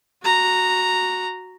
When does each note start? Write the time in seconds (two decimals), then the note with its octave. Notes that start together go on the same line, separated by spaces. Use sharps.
0.23 F#4 A#5